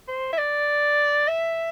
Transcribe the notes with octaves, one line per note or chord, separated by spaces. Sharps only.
C5
E5
D5
E5